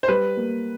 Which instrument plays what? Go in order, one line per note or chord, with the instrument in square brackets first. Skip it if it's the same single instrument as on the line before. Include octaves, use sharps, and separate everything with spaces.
[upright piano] C5
[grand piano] G3 [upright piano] B4
[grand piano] A#3